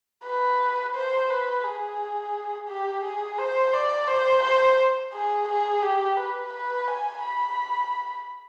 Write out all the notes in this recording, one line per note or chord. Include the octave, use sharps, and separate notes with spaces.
B4
C5
B4
G#4
G4
G#4
C5
D5
C5
C5
G#4
G#4
G4
B4
B4
G#5
B5